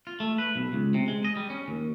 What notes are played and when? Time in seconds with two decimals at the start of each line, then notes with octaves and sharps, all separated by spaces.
0.07 F4
0.20 A3
0.38 B4
0.56 B1
0.73 C#2
0.94 C3
1.08 G#3
1.24 D#5
1.37 G3
1.50 C#4
1.68 D#2